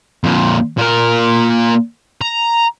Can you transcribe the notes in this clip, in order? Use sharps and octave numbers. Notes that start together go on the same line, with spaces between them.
F2 A#2
A#2 A#4
A#5